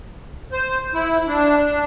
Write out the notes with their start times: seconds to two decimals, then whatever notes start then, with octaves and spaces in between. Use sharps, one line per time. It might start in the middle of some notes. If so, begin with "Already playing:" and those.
0.52 C5
0.94 E4
1.28 D4
1.57 D4